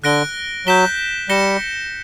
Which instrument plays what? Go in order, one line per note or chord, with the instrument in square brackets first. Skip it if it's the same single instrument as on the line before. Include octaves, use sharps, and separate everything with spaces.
[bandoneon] D3 [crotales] F#6 A#6 D7 G7
[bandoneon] F#3 [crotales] G6 B6 E7 G7
[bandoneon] G3 [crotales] A#6 C#7 E7 G7